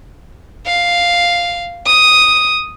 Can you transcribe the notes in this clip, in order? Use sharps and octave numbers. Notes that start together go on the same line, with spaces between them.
F5
D#6